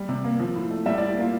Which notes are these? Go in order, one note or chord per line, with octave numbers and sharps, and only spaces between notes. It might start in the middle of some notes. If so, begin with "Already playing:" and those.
Already playing: G3
C3
A#3
F3
A2
A3
G3 E5
D5
A2
G4
A#3 F4